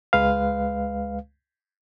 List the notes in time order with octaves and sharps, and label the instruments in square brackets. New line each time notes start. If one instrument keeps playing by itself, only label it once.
[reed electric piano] C#2 G#3 B4 F5